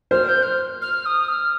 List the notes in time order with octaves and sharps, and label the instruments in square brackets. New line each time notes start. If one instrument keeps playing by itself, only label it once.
[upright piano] C5 [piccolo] F6
[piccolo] G6
F6
F6
D#6
F6